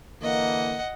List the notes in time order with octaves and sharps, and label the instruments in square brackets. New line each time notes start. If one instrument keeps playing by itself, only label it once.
[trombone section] D3 E3 A#3 [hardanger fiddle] D#5 F#5